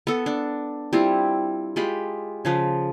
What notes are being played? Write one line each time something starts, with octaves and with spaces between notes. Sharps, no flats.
B3 A4
D4
G3 C4 E4 F4
G#3 F4 G4 B5
C#3 F3 B4